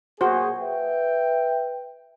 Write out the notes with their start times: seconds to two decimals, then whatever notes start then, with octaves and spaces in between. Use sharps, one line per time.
0.21 A#2 F#4 G#4 C5
0.59 B4 E5 G5